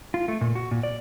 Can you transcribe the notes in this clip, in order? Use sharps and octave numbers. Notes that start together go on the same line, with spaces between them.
F4
A3
A#2
F#4
A#2
D5